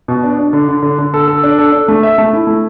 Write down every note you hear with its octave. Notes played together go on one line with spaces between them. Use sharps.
B2
D4
D4
D3
D3
D3
D3
A4
A4
D4
A4
D4
A3
E5
A3
E4
A3